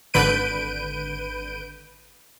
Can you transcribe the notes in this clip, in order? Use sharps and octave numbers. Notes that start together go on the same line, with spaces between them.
G#1 D3 B4 G6 D7 D#7